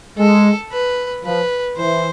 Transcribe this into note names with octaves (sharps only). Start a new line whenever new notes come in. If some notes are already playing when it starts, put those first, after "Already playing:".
G#3 A4
B4
F3 B4
E3 C5